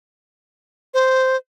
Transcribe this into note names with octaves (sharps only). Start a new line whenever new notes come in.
C5